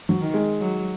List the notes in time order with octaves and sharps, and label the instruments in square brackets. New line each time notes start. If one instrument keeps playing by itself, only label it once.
[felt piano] F#3
[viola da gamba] D#3
[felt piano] G#3
[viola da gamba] F#3